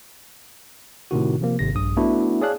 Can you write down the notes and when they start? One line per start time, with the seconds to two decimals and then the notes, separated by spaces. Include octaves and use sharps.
1.11 A2 C3 D#3 F#4
1.41 C3 F3 A#3
1.59 G#1 C3 A#6
1.74 A#1 G2 D#6
1.97 A3 B3 D4 E4 F#4
2.42 G#4 C#5 D5 F5 A5 F#6